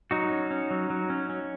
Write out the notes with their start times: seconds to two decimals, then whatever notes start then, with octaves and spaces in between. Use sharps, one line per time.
0.11 F#3 D#4 F#4
0.32 C#4
0.51 C#4
0.71 F#3
0.90 F#3
1.10 C#4
1.29 C#4